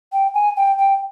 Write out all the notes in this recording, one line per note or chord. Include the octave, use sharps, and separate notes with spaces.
G5
G#5
G5
G5